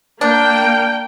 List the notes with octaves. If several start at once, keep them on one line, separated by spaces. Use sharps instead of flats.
A#3 D4 G5